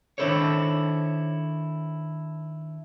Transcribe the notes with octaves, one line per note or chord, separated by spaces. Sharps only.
D#3 D4 E4 A4 C5 C#5